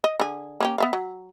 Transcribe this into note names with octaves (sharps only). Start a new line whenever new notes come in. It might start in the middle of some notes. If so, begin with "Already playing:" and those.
D#5
D3 G#4
A#3 C#4 G4
B3 E5 F5
F#3